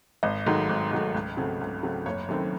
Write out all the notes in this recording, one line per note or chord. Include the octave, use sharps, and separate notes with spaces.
G#1 D#5
G#2 D#3 F#3 A3
G#1
G#2 D#3 F#3 A3
C#2
C#3 F#3 A3 C4
C#2
C#3 F#3 A3 C4
F#1 C#5
F#2 D#3 A3 C4